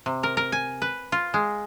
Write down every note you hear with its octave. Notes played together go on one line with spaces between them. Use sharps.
C3
A#4
A#4
G#5
B4
F4
G#3